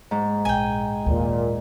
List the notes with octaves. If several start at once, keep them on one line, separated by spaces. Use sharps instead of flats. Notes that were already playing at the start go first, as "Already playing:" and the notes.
G#2
A#1 G5 G#5
D#2 A#2